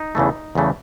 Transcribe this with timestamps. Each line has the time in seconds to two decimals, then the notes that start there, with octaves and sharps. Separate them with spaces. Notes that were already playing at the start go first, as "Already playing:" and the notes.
Already playing: D#4
0.15 E2 C#3 E3 A3
0.55 E2 C#3 E3 A3